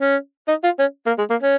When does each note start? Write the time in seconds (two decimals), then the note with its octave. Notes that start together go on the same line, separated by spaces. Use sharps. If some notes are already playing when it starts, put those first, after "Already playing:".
0.01 C#4
0.48 D#4
0.63 F4
0.79 C#4
1.06 A#3
1.18 G#3
1.30 A#3
1.42 C#4